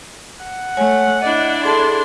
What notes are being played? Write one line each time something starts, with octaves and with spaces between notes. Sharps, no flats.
F#5
A3 C#5 G#5
D4 E4 D5 D#5
G#4 A4 A5 C6